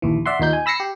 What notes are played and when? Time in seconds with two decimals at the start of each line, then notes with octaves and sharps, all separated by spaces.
0.02 A#1 D#2 E3
0.26 D5 E5 F#5 C6
0.40 D#2 A#2 D#4 G6
0.53 G#5
0.66 B5 E6 A#6 C7 C#7
0.80 G4